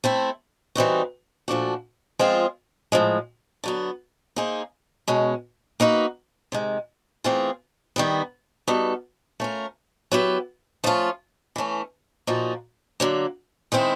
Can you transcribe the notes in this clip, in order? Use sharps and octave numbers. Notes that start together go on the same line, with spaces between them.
A3 C4 E4
E3 G3 C4 D#4 F#4
A#2 F3 A3 D4 F#4
F3 G#3 C4 F4 G#4
A2 F3 G#3
D3 F#3 B3
A#3 D#4 G#4 C5
B2 G#3 C#4
A#3 D#4 F#4 B4
C3 D#3 G#3
E3 A3 C4 F4 G#4
D#3 G3 B3
G3 B3 D#4 F#4 A4
A3 C#4 F4 A#4
F#3 B3 E4 G4 B4
F3 A3 C#4 F4
E3 A3 C#4
A#2 F3 A#3 D#4 F#4
D3 F#3 A#3
D#3 G#3 C4 E4